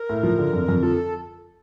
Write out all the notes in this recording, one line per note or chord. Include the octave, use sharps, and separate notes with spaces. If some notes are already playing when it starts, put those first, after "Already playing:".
Already playing: A#4
A2
F3
D3
F2
F2
F3 A4